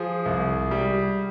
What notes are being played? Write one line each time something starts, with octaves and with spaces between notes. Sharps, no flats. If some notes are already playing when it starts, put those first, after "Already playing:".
Already playing: F3 G#4
C2
G3